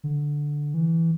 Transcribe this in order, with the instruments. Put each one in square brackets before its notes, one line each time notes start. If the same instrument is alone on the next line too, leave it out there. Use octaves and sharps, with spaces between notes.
[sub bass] D3
E3